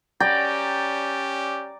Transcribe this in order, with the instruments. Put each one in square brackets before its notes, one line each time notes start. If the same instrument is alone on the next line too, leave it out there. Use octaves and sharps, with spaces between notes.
[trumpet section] C#4 G4 [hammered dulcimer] D5 G5 A#5